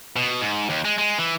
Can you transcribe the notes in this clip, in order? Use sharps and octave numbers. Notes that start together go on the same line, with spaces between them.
B2
G#2
D#2
G#3
G#3
E3